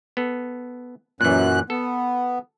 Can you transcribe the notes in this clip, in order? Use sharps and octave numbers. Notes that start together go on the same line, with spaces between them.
B3 A4
F#2 A#2 E3 F#6
B3 A4